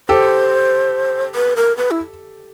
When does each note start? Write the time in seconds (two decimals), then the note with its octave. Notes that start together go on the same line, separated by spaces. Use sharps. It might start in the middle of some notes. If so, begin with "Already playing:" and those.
0.09 G4 A4 C5
1.35 B4
1.56 A#4
1.77 B4
1.91 E4